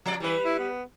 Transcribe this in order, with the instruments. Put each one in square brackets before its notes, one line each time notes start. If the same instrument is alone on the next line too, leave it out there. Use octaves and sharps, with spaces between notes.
[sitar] F3 D5
[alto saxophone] E3 [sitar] G3 B4
[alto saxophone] E4
B3